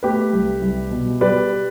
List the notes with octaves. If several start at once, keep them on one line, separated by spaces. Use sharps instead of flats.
A3 G4 B4
C2
C2
B2
G3 B4 D5